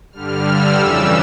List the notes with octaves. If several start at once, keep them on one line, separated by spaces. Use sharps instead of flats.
G2 D3 G3 F6
E6
F2 C#3 E3 G3